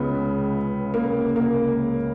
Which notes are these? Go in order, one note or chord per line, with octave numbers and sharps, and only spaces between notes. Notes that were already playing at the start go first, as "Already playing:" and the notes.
Already playing: C#2 C#3 B3
A#3
A#3